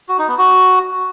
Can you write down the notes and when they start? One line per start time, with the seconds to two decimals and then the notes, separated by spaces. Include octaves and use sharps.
0.09 F#4
0.18 D#4
0.28 B3
0.38 F#4